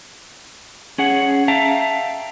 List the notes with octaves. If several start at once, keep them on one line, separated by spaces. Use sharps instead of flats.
C#4 G#4 F#5
E5 F5 G5 A5 A#5